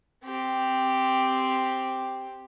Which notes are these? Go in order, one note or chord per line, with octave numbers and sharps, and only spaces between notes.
C4 G4